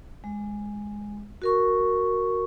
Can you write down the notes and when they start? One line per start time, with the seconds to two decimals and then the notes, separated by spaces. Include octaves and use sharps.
0.24 G#3
1.42 F#4 A#4 C#6